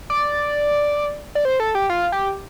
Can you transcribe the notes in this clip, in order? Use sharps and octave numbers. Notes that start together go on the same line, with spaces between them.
D5
D5
C5
A4
G4
F4
G4